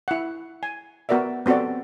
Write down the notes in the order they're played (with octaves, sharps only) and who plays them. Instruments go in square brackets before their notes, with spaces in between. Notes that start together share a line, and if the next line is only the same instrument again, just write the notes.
[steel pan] E4 F#5
G#5
B3 F#4 A#4 D5 E5
B3 C4 F#4 A4 D5